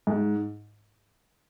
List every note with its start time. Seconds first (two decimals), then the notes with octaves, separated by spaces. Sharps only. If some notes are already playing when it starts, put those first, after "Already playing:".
0.07 G#2